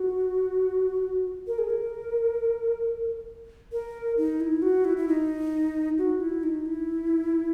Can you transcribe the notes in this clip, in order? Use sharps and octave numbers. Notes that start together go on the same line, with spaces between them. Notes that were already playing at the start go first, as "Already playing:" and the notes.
Already playing: F#4
A#4
G#4
A#4
A#4
D#4
E4
F#4
E4
E4
D#4
F#4
E4
D#4
E4